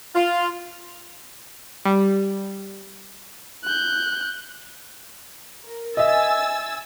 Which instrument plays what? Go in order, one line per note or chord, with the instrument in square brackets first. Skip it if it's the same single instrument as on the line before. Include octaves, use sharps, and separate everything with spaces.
[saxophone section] F4
[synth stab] G3
[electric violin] F#6 G6
[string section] A#4
[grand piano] D#5 E5 [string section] G#5 E6 A6